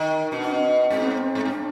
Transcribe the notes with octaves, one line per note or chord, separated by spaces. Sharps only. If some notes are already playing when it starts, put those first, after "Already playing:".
Already playing: D#3
B2 D4
D4
C4
G#2 C4
B3
C4
G#2
G#2
D4